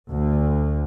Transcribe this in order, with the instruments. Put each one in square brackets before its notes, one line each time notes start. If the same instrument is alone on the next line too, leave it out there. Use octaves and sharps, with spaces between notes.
[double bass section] D2